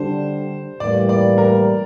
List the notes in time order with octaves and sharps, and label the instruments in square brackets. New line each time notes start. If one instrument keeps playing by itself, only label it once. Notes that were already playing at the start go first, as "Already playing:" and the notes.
Already playing: [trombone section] D3 G3 D4 [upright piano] C5
[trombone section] A2 E3 G3 A#3 [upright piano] D5
[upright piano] D5
A#4